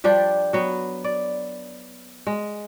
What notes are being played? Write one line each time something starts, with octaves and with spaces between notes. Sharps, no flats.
F3 G3 D4 G4
F#3 B3
D5
G#3